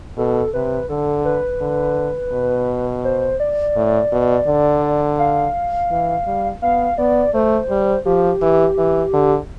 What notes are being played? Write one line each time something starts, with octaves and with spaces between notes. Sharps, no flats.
B2 A4
C3 B4
D3 A4
B4
D3
B2
C5
D5
A2
B2
D3
F5
E3
G3
B3 F5
B3 D5
A3 C5
G3
F3 G4
E3
E3
D3